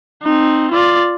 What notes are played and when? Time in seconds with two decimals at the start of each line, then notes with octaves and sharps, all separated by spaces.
0.22 C4 D#4
0.71 F4 D5